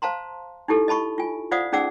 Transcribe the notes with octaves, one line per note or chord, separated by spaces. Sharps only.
C5 F5 A5 A#5 C6
D#4 E4 G4 A4
D#5 A5 B5 C#6
F4 G#5
F4 C5 D5 F5 F#5 D#6
C#4 D#4 G#4 D5 F#5 E6